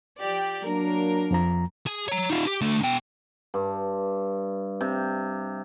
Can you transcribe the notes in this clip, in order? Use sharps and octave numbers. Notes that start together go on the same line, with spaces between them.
F3 G4 D5
F#3 A#3 D4 A#4
F2 F3 A#5
G#4
C#5 A#5
D#4 F4
G4
D3 A3
B2 G5
G2
C3